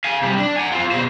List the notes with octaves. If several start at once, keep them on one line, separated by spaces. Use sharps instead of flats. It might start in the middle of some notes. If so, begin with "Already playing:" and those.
F5 G#5
C3 G3
D4
F#5 G#5
C4 F4
B2 C5